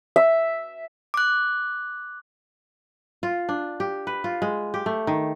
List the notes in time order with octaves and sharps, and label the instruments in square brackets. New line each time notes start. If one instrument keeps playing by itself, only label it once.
[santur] E5
[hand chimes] D6 F#6
[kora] F4
D4
G4
B4
F4
G#3
G4
A3
D#3